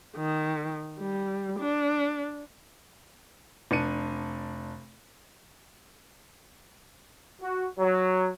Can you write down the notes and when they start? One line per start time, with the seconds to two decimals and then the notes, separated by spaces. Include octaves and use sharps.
0.17 D#3
0.99 G3
1.59 D4
3.71 F1 D4 C#7 D#7
7.41 F#4
7.78 F#3